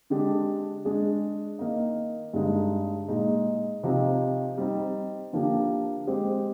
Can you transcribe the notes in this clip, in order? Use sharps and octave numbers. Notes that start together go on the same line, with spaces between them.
D3 G#3 D4 G4
G#3 D4 G#4
D#3 A#3 D#4
G2 D3 G#3 D#4
A#2 G#3 D#4
C3 F3 C4 D#4 G4
G3 C4 D#4
D3 F3 A#3 D4 G4
G#3 C4 G4 C5